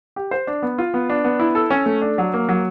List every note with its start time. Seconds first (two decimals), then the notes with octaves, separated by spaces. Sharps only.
0.16 G4
0.31 C5
0.47 D4
0.62 B3
0.78 F4
0.94 B3
1.10 D4
1.24 B3
1.40 E4
1.55 A4
1.70 C#4
1.86 A3
2.02 D4
2.18 F#3
2.33 A#3
2.49 F#3